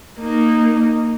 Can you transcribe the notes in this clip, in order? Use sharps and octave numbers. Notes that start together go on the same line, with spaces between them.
A#3 D#4